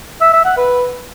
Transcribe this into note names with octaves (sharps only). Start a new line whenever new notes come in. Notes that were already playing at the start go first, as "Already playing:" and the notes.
E5
E5
F#5
B4